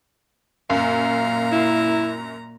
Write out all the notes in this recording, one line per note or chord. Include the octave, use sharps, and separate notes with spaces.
F#2 A#2 F5 A#5
E4